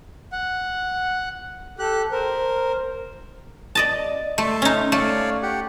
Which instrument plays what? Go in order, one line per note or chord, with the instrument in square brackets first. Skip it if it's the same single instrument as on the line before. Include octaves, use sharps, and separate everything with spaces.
[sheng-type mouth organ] F#5
[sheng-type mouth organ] G4 F#6 [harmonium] A4
[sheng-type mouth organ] A#4 [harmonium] C5
[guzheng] D5 D#5 A5
[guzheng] A3 [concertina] E5 A5 C6
[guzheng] C#4 D#4
[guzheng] A3 [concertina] C#5 D5 F5
[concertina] G4 F#5